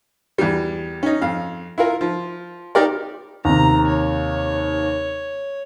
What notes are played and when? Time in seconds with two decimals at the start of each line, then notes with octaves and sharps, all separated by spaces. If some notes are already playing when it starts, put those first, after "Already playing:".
0.38 E2 G3
1.03 C#4 D#4
1.21 F2 F5
1.78 E4 F4 A#4
2.01 F3
2.75 D#4 G4 A#4 D5
3.45 D#2 C3 A#5
3.88 C#5